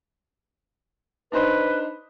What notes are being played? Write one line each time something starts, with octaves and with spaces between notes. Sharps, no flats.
D4 D#4 B4 C5